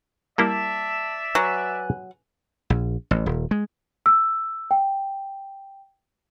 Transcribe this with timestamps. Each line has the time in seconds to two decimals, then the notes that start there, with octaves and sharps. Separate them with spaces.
0.38 G3 A#3 E4 D5 E5 A5
1.35 F#3 B4 G#5 F#6
2.70 A#1
3.11 A1
3.26 D#1
3.51 G#3
4.06 E6
4.71 G5